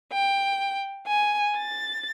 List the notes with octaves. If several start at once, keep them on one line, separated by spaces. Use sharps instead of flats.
G5
G#5
A6